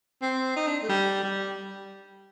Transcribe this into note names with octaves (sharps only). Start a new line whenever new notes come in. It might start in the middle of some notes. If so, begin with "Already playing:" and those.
C4
D#4
D4
A3
G3
G3